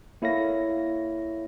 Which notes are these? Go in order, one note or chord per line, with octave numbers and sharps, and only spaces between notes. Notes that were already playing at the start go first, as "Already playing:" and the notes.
A#3 E4 A4 C#5 F5 A#6